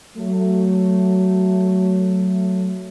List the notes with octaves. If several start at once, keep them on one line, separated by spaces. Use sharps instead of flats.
F#3 A3